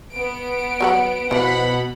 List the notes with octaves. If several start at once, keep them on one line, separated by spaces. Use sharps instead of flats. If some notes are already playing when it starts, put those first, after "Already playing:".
B3 D7
F#3 A#4 F#5
B2 E3 F3 F#5 B5